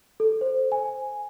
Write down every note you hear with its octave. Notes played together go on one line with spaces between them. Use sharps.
A4
C5
G#5